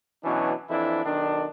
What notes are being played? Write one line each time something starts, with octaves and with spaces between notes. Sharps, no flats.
B2 E3 F#3 C#4 D4
F2 E3 D4 E4
B1 D#3 D4